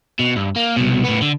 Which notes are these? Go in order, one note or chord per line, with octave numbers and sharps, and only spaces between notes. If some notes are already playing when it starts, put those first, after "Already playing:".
B2
G2
A#3
C2 B2
A2 B3
D3